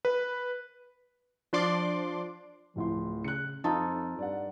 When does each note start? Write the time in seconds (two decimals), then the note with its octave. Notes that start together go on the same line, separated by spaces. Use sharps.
0.05 B4
1.53 F3 D4 D5 C6 D6
2.76 D1 A2 F3 C6
3.24 C#3 F#6 C#7
3.64 F2 D#4 F4 A4
4.19 G2 D5 F#5